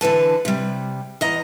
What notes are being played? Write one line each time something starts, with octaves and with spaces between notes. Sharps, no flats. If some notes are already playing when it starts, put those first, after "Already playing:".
D3 E3 B4 A5
C3 G3
E2 D#5 A#5